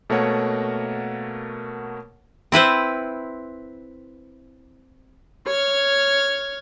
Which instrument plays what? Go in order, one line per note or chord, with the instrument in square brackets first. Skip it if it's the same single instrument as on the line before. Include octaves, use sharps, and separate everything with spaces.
[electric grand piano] B2 A3 A#3 A#4 C#5 F#5
[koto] C4 E4 B4 C5
[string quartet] C#5 F6 G#6